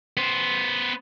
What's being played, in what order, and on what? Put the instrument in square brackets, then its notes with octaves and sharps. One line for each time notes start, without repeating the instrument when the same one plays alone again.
[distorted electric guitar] B3 C5